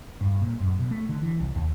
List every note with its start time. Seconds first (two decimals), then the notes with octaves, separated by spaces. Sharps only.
0.21 G2
0.42 A#2
0.60 F#2
0.79 B2
0.91 A3
1.09 D3
1.22 E3
1.40 C2
1.56 D#2